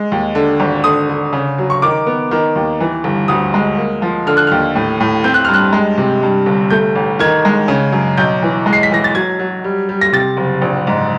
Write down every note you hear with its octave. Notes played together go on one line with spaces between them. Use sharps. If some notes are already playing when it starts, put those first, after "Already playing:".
Already playing: G#3
D#2
D3
G#1
D3 D#6
D3
C#3
F#3
C#6
D#3 D6
B3
D#3
D#2
E3
G1
D2 D#6
G#3
A#3
F3
D3 F6
F#6
D#2 F6
A2
A2
C4 G6
F#6
G2 F6
F#6
G#3
C3
G2
G1
A3 G6
A1
D#3 G#6
G#3
C#3
F#2
B1 G6
E3
G#3
C7
B6
E3 A#6
A6
F#3 G#6
F#3
G3
G3
A#6
C3 A6
F#1
A#1
G#2